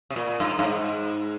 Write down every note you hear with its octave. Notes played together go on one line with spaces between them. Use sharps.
C3
A#2
G2
G2
G#2